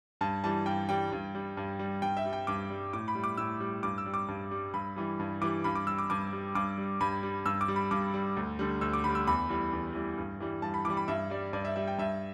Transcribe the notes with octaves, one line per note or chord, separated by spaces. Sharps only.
G2 A5
E3 G3 A5
G2 G5
E3 G3 G5
G2
G3
G2
G3
G2 G5
E5
G3
G5
G2 D6
G3
A2 D6
B5
G3
D6
A2 E6
G3
G2 D6
E6
G3
D6
G2
G3
G2 B5
E3 G3
G2
E3 G3 D6
G2 B5
D6
G3 E6
D6
G2 D6
G3
G2 D6
G3
G2 B5
G3
G2 E6
D6
G3
B5
G2 D6
G3
D2
D3 G3
D2 E6
D6
D3 G3 B5
E6
E2 B5
E3 G3
E2
E3 G3
G2
E3 G3
G2 A5
B5
E3 D6
G3
B5
G2 E5
G3 D5
G2 D5
E5
G3 E5
G5
G2 E5